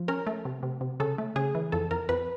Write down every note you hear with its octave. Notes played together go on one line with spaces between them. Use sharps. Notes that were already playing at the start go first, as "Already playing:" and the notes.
Already playing: F3
C#4 A#4
A3
C3
C3
C3
C#3 A4
A3
C#3 G#4
E3
F2 A4
F2 A#4
F2 B4